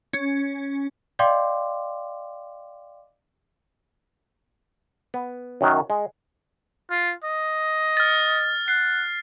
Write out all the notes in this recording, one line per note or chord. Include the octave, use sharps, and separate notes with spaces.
C#4
D5 D#5 F5 G5 C6 D6
B3
F#2 D#3 F#3
G#3
F4
D#5
F6 A6
F#5 C7